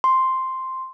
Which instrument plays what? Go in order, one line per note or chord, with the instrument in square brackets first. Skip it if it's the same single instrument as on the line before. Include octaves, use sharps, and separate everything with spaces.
[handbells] C6